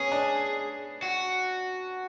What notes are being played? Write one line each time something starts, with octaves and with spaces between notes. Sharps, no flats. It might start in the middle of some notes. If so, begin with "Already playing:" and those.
Already playing: B3 C#4 G#4
D4
F#4